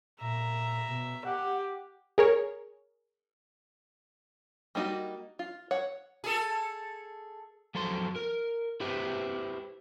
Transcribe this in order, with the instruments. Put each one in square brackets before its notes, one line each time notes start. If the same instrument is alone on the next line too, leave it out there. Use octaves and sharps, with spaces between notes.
[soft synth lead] A#2 [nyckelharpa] E5 A#5
[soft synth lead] B2
[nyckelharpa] G4 [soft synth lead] F#5
[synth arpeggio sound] G#4 A#4 C#5
[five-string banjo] G3 A#3 D#4 F4 F#4
F4
C#5 F#5
[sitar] G#4 A4
[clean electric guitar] F3 F#3 A4 C5 C6
A#4
E4 G4 B4 C5 E5